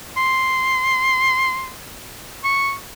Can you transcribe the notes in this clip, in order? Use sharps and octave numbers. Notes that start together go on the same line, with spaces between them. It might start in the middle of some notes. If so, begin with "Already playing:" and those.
C6
C#6